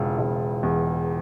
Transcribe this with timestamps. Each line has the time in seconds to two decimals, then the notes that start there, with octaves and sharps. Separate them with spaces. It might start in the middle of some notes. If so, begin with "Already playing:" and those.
Already playing: E1 C#3 E3 F4
0.19 E1
0.63 E2